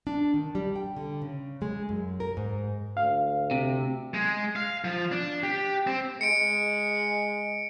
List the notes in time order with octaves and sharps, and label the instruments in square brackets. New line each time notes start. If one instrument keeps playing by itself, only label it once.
[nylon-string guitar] D4
D#3
G3
G5
D3
C#3
G#3
F#2
A#4
G#2
[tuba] D2 [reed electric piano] F5
[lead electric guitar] C3
G#3
F5
F3
D4
G4
C4
[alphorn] G#3 [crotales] C#7 D7